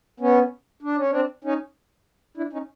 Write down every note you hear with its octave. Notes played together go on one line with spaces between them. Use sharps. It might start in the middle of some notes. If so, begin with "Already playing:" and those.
B3 C#4
D4
C#4
C4 D4
C#4 D#4
D4 E4
C#4 D#4